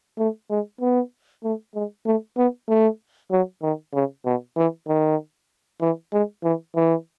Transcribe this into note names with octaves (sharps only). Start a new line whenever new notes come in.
A3
G#3
B3
A3
G#3
A3
B3
A3
F#3
D#3
C#3
B2
E3
D#3
E3
G#3
E3
E3